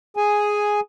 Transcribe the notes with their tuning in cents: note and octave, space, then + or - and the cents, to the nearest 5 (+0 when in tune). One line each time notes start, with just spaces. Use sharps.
G#4 +0 G#5 +0